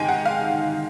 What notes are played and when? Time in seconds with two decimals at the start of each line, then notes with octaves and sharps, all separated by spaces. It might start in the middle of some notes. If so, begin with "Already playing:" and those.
Already playing: G#2 D#3 G#3 G5 G#5
0.09 F#5
0.25 F5